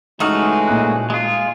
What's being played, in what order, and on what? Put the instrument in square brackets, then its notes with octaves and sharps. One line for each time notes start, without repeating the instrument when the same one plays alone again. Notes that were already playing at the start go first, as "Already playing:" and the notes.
[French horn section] C#3 E3 G#3 [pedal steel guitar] A3 F#4 F6 [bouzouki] D#4
[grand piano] A#2 F#6
[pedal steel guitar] G#3 F4